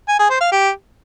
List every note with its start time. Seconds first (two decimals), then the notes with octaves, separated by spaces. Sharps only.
0.08 G#5
0.19 G#4
0.30 C5
0.41 F5
0.51 G4